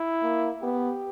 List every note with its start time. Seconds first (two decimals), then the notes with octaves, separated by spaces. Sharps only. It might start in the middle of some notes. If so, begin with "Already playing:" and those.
Already playing: E4
0.23 A#3
0.63 B3 G4